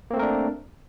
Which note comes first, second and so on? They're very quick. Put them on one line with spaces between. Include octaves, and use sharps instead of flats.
A#3 C4 A3 A#4 D4